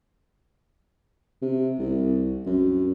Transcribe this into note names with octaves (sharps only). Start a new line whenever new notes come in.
C3
C2
F#2